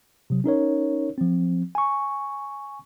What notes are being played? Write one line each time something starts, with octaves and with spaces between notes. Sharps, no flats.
C3 F#3
C#4 D#4 A#4 C#5
F3 C4
G#5 C#6